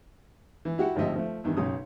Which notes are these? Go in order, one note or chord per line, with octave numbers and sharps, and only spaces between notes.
E3
E4 F#4 G4 F#5
G#1 D2 F3 G4 D#5 E5
F3 A3
E2 G2 D#3 E3
B1 F#2 C#3 C#4 D#6